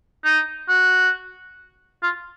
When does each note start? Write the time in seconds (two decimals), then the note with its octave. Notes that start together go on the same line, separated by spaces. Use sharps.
0.24 D#4
0.69 F#4
2.03 F4